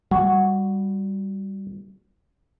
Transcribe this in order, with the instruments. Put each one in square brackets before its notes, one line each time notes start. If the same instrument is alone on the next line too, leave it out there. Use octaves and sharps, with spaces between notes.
[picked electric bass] G3 [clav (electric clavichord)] F#4